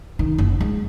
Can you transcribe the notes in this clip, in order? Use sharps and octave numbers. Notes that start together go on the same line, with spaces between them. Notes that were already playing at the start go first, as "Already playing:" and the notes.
D#3
F#1
G#3